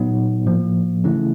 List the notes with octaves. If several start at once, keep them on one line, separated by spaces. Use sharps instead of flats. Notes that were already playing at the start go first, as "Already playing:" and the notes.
Already playing: A#2 F#3 B3 D#4
A2 F3 A#3
C#3 E3 A3 C#4 E4